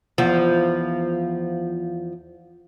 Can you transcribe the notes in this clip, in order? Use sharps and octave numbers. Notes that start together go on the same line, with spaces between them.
E2 F3